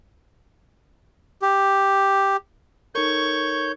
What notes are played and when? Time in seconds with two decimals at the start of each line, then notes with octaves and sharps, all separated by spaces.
1.42 G4
2.95 D#4 A4 A#4 C#5 C#6 G6